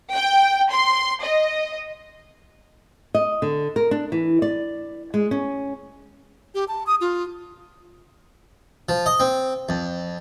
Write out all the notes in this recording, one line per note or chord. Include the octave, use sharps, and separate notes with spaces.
G5
C6
D#5
D#5
D3
A#4
D4
E3
D5
G#3
C#4
G4
A5
D#6
F4
F3
D#5
C4
F2